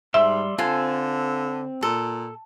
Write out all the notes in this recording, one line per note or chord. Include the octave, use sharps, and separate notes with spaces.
G#2 G3 E5 C6 E6
D3 C4 F4 A4 G#5
A#2 A4